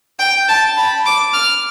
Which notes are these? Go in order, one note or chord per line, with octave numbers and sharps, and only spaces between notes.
G5
A5
B5
D6
F6